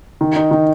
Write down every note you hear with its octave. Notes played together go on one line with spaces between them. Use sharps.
D#3
D#4
D#3